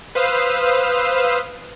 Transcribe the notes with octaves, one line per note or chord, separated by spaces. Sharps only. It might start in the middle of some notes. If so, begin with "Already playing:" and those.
B4 C5 F5 D#6 E6